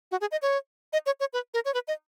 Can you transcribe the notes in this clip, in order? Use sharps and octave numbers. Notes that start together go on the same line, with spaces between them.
F#4
G#4
D#5
C#5
D#5
C#5
C#5
B4
A#4
C#5
B4
D#5